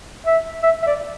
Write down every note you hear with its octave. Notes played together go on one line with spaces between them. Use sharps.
E5
E5
E5
D5